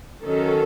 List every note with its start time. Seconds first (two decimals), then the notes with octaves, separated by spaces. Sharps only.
0.23 D#3 F#3 C#4 A4